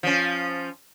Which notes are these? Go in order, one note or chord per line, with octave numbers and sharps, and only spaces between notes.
F3 C#4